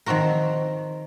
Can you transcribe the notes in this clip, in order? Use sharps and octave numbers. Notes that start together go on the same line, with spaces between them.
D#3 F3 C4 F#4 A#4